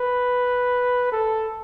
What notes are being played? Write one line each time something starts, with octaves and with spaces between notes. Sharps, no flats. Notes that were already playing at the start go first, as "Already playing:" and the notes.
Already playing: B4
A4